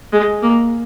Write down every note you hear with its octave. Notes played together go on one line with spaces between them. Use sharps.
G#3
A#3